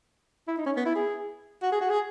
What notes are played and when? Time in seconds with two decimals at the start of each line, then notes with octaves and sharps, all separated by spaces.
0.48 E4
0.58 D#4
0.66 C#4
0.77 B3
0.86 E4
0.96 G#4
1.63 F#4
1.72 G#4
1.81 F#4
1.90 G#4